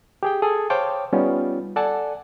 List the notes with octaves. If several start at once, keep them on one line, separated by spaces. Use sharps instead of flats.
G4 G#4 G5
G#4 A4
C5 C#5 F5 G5 A5 D6
G3 B3 C#4 D#4 F4
A4 D5 F#5 G#5 A5